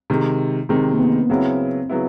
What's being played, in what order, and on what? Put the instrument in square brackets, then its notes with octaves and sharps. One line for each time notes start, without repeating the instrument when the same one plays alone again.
[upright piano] C3 D#3 G#3
[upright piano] C3 D#3 G#3 [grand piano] C4
[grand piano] A#3
B3
[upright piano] C#3 F#3 B3 E4 [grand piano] C4
[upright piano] C#3 F#3 B3 E4